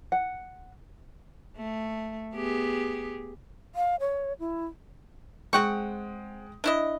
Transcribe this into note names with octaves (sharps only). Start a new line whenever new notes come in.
F#5
A3
B3 G4 G#4
F5
C#5
E4
G#3 C4 F#5 G5 C#6
D4 E4 D#5